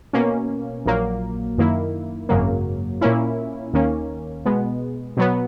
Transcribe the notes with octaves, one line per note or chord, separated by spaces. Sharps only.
B2 A#3 C#4
A#1 A#2 F#3 A#3
F#2 D#3 A#3 E4
G#1 F#2 C#3 F#3 A#3
A#2 A#3 C#4 E4
D#2 D#3 A#3 C#4
B2 G#3 B3
B2 F#3 B3